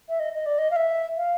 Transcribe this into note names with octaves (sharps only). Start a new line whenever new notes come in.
E5
D#5
D#5
D5
D#5
F5
E5
F5